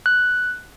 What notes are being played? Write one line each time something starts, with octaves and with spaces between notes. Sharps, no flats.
F#6